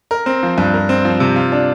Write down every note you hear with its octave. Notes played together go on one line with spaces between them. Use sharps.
A#4
C4
F3
G2
A#4
C4
F3
C3
F4
D4